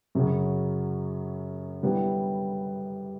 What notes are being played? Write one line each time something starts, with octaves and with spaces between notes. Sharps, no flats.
F#2 C#3 F#3
D3 G3 B3 E4